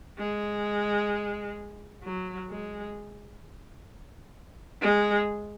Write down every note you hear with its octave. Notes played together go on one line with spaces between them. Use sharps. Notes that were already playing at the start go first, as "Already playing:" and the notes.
G#3
F#3
G#3
G#3